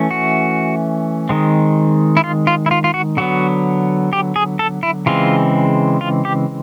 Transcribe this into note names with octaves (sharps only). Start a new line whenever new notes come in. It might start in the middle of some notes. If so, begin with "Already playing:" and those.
Already playing: E3 A3 C#4
F#4
D#3 G#3 C4
E4
F4
F4
E4
F4
F4
F#4
D3 F#3 B3 F#4
G4
G#4
A4
E4
C#3 E3 G#3 C4 F4
F4
G4